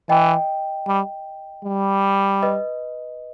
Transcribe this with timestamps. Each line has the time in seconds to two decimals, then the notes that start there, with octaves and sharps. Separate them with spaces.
0.09 E3 D#5 G5
0.88 G3
1.65 G3
2.43 B4 D#5